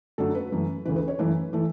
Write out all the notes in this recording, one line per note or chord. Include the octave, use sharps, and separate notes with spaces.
F#2 D3 F#3 A3 A4
B4
F#2 E3 A3
D2 C#3 E3 B4
B4
C#5
F#2 E3 A3 B4
E3 A3